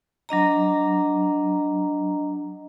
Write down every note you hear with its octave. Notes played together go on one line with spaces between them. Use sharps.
F#3 D4 D#5 A#5